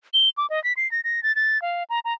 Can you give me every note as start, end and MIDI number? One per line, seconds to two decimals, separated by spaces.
0.14 0.29 103
0.38 0.46 86
0.50 0.62 75
0.64 0.73 95
0.77 0.90 96
0.92 1.01 94
1.04 1.23 94
1.23 1.35 93
1.36 1.61 93
1.62 1.84 77
1.90 2.00 82
2.05 2.13 82